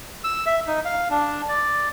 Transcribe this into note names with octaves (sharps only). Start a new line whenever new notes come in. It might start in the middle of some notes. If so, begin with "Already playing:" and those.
E6
E5
D#4
F5
D4
D5